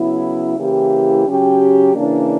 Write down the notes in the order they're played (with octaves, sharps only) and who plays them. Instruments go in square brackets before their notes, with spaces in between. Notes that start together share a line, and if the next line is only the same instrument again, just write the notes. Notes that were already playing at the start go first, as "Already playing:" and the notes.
Already playing: [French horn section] C#3 F#3 B3 E4
C#3 E3 A#3 E4 G4
C#3 F#3 C#4 G4
C#3 E3 A#3 D4